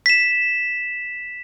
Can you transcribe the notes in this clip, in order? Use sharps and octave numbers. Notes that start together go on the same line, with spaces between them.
B6 E7